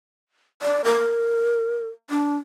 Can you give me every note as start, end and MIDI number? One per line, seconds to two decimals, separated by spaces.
0.62 0.81 74
0.85 1.89 70
2.10 2.36 62